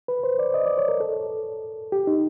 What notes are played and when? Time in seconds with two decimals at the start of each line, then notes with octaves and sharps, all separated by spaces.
0.08 B4
0.24 C5
0.39 D5
0.54 D#5
0.66 D5
0.78 C#5
0.89 A#4
1.00 A4
1.92 G4
2.07 D#4